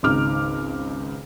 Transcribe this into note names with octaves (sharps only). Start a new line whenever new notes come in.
G#1 C#2 D#4 D6 F6